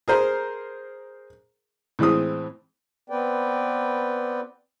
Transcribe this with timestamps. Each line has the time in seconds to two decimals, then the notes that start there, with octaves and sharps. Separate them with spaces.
0.08 G#4 A#4 C5
1.99 A2 E3 G#3 C4 D#6
3.10 B3 C4 B4 D5 G5